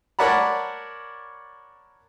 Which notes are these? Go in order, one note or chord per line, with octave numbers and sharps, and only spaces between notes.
A#4 C#5 D5 F#5 A5 B5